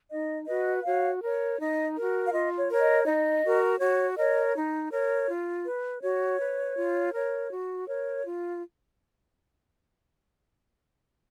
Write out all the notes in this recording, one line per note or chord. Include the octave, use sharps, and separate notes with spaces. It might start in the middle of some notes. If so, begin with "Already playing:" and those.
D#4 D#5
F#4 B4 D#5
F#4 C#5 F5
A#4 C#5
D#4 D#5
F#4 A#4
F5
F4 D#5
C#5
A#4 C#5
D#5
D#4 D#5
F#4 A#4
F#4 C#5
A#4 C#5 D#5
D#4
A#4 C#5
F4
B4
F#4 C#5
B4
F4
A#4 C#5
F#4
A#4 C#5
F4